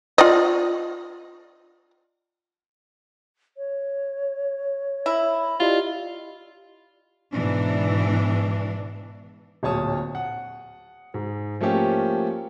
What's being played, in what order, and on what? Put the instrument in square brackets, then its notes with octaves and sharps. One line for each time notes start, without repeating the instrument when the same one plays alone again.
[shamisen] F4 D5 D#5
[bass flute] C#5
[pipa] E4 [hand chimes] E5
[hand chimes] E4 G4 D#5 [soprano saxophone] F4 [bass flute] D5
[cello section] G#2 B2 E3 D4
[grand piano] D1 A#2 C#5 A5 D#6
F#5
G#2
F3 A3 A#3 C#4 G4